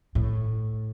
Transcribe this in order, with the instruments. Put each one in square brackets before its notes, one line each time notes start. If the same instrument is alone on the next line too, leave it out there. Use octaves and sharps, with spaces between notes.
[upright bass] A2